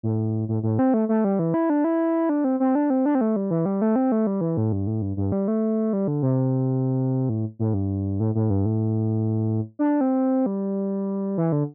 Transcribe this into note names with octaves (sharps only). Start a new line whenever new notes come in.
A2
A2
A2
C4
A3
A3
G3
E3
E4
D4
E4
D4
C4
C4
D4
C4
D4
C4
A3
G3
E3
G3
A3
C4
A3
G3
E3
A2
G2
A2
G2
G2
G3
A3
G3
D3
C3
A2
A2
G2
A2
A2
G2
A2
D4
C4
G3
E3
D3